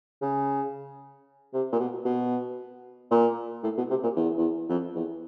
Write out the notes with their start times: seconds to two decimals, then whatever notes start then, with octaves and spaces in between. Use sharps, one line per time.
0.22 C#3
1.54 C3
1.73 A#2
1.79 B2
2.05 B2
3.11 A#2
3.64 A2
3.78 B2
3.90 C3
4.03 A#2
4.16 E2
4.38 E2
4.69 F2
4.96 E2